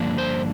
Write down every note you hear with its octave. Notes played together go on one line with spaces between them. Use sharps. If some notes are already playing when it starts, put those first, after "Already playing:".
Already playing: G2 D3 F3 A#3 D4
C5